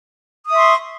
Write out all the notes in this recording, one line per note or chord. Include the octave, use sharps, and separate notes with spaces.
E5 C6 C#6 D#6